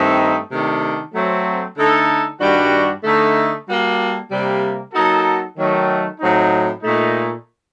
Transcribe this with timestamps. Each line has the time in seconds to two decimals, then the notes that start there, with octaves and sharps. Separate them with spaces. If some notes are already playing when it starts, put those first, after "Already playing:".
Already playing: G2 D#3 A3 C4 D#4
0.50 C3 D#3 A3 D4
1.13 F#3 A3 C4
1.76 D3 A3 D#4 A4
2.39 G2 D#3 G3 D4 F#4
3.03 D3 A3 D#4
3.66 G3 A#3 F#4 A4
4.30 C3 G3 A#3
4.92 F#3 A#3 D#4 F#4 A4
5.56 D#3 F#3 A3
6.19 A2 F#3 C4 D#4
6.82 A#2 A3 D#4